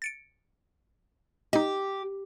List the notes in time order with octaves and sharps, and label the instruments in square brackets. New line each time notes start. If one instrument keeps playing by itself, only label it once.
[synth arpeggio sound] A6 C#7 D7
[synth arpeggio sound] D#4 D#5 [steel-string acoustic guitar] G4